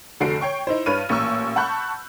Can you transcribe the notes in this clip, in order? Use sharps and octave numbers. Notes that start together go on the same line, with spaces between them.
F1 D3 A3 F#4 C7 D7
C#5 G5 C#6
D#4 E4 C5
G2 B4 C#5 F6 D#7
A1 A#2 C#6 E6
F#5 A5 B5 C#6 F#6 G6